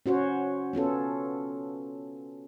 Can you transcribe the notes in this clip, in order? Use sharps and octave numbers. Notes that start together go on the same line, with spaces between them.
C#4 F#4 C5 C#5
B3 C#4 F4 A4